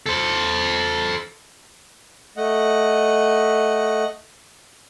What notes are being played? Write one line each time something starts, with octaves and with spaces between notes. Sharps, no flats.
A4 C5
A3 D#5 F#5